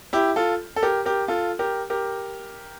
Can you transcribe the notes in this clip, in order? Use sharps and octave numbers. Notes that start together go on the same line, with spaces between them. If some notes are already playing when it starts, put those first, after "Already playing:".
E4 G4
F4 A4
A4
G4 A#4
G4 A#4
F4 A4
G4 A#4
G4 A#4